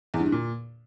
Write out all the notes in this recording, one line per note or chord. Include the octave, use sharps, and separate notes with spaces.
E2
G2
D3
A#2